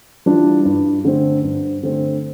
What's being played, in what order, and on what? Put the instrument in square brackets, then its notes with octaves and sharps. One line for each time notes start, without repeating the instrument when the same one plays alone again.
[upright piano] E3 G3 D4 F4
G2
D3 A3 C4
G2
D3 A3 C4